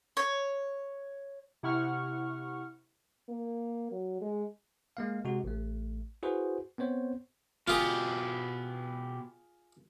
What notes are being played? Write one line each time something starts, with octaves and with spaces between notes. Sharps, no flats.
C#5
C3 E4 F#5 C#6 F6
A#3
F#3
G#3
G#3 A#3 F5
C3 G#3 F#4
A1 A3
E4 F#4 G#4 B4 C5
B3 C4 C5 C#5
B2 F4 G4 G#4